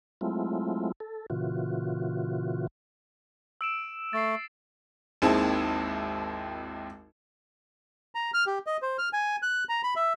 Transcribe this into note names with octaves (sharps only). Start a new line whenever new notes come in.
F#3 G#3 A3 C4 E4 F4
A4
A#2 C#3 E3 F4 F#4
E6 D7 E7
A3 A6 C7
G#1 D#2 C4 E4 G#4 A5
A#5
F6
G4
D#5
C5
F6
G#5
F#6
A#5
B5
E5